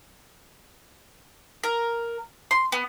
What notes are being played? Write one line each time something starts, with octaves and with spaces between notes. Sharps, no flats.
A#4
C6
B3